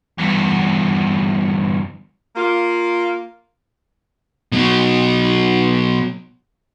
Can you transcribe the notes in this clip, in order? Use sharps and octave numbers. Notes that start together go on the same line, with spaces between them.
E2 G2
A#3 F4
B2 F#3